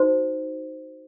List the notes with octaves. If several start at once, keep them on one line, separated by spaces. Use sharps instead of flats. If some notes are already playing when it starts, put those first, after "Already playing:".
Already playing: D#4 F#4 C5